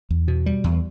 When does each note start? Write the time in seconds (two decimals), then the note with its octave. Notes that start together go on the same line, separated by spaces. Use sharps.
0.10 E2
0.28 B2
0.46 G3
0.64 E2